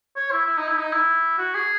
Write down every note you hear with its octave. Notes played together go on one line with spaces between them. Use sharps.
C#5
E4
E4
D#4
E4
D#4
E4
F#4
G#4